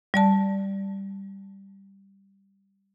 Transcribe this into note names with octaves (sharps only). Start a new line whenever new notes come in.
G3 D5 A5